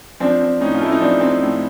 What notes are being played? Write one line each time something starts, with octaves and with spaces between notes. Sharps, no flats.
F3 C4 D4
C4
A2 C#4 D#4
F4
A3 E4
D#4
F3 C4 D4
C4
A2